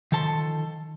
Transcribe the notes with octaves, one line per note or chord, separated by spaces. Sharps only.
D#3 F3 A4 A5 C6